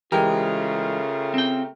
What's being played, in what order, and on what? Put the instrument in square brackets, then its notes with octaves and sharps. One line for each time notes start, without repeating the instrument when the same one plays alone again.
[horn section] C#3 A3 F4 [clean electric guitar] E3 G#3 [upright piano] G4 A#4
[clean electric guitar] C4 G5